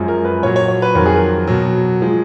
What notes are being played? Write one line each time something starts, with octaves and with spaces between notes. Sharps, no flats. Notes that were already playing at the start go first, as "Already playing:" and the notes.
Already playing: F#2 F3 G#3
A#4
B4
A#2 F#3 C#5
C#5
C#5
B4
F2 D#3 F#3 A#4
G#4
A#4
B2 F#3
F3 G#3